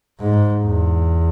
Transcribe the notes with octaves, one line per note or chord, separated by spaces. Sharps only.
G#2
E2